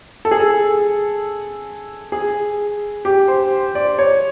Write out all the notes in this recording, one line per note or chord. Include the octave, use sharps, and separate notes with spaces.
A4
G#4
A4
G#4
G4
C5
D5
C#5